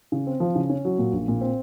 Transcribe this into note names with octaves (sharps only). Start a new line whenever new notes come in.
C#3
C4
F3
C#3
C#4
F#3
A#2
A#1
A#2
C4